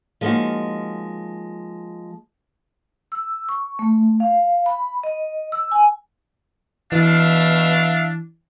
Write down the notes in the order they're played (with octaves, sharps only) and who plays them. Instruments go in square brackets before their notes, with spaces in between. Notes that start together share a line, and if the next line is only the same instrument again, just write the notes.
[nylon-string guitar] F3 G#3 A#3 C#4 D#4 F#4
[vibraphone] E6
C#6
A3
F5
B5
D#5
E6
G#5
[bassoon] B2 [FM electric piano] E3 [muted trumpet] D4 [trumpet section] E5 F5